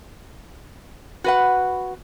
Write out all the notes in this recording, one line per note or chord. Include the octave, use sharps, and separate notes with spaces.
F#4 B4 F#5